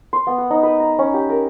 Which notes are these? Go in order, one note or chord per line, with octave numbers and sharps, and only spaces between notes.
C6
B3
F#5
D#4
B4
A#5
C#4
G4
A#4